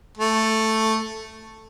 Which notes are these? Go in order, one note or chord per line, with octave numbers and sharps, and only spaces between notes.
A3